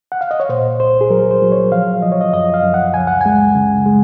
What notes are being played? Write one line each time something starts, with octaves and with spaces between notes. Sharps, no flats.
F#5
F5
D#5
C#5
A#2 C5
C2 C5
G#4
F#3 A#4
C5
F#3
C#5
F3 F5
F3 D#5
C#5
D#5
F#2 D#5
F5
F#2
F#5
C#2 G#5
F#5
G#3 G#5
C#3
G#3